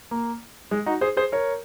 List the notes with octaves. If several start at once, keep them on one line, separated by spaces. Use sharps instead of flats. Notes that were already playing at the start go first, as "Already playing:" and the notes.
A#3
G#3
D#4 F#4
G#4 C5
G#4 C5
A#4 C#5